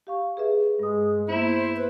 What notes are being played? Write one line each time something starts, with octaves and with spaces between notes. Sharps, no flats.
G4 F5 C#6
G#4 B4 E5
G2 G#3 D#6
A#3 B3 E4 C5
B4